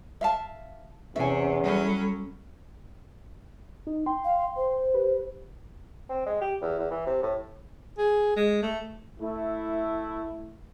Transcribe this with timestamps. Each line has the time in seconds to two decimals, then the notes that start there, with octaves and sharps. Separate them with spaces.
0.21 E5 F5 A5
1.16 E2 C3 C#4 C#5 E5 G#5
1.63 F#3 G3 C#4 A4 B5
3.87 D#4
4.06 G5 C6
4.25 F5
4.56 C5
4.94 G4 B4
6.09 C4
6.26 G#3
6.41 G4
6.61 E2
6.79 E2
6.91 E3
7.06 C3
7.22 A2
7.98 G#4
8.36 G#3
8.63 A3
9.20 A3 E4